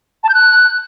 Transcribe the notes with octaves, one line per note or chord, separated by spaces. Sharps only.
A5
G6
F#6